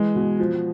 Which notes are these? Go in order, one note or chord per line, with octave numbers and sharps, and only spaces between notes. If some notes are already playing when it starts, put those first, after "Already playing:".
Already playing: E3 G#3
B2
F3